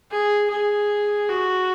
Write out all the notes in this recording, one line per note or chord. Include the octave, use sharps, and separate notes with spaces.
G#4
G#4
F#4